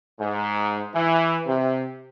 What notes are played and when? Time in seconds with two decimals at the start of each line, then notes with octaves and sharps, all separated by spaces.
0.19 G#2
0.94 E3
1.46 C3